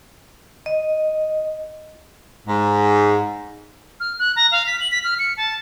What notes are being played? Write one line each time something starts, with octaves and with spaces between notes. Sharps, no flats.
D#5
G#2
F6
F#6
A#5
F5
B6
F#7
B6
F6
C#7
A5